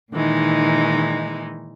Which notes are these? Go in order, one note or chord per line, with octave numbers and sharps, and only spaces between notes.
A#2 D#3 E3 G#3 D#4